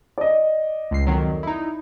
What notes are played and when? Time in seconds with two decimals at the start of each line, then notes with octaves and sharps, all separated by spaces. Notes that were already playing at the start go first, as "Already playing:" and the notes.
0.18 D5 D#5
0.91 C#2 C7
1.07 F2 D#3 F#3
1.43 D#4 E4